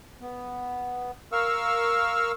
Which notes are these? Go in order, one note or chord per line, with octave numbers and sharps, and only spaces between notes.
B3
A#4 F5 C#6 E6 F6